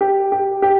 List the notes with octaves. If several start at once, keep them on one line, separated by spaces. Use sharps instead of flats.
G4
G4
G4